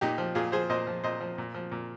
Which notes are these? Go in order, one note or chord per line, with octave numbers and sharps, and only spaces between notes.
A#2 D#4 G4
F3
A#2 F4 G#4
F3 G#4 C5
A#2 C5 D#5
F3
A#2 C5 D#5
F3
A#2
F3
A#2